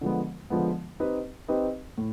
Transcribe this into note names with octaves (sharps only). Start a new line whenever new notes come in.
D3 F3 G#3 B3
D3 F3 G#3 B3
C4 D#4 G4 B4 D#5
C4 D#4 G4 B4 D#5
A2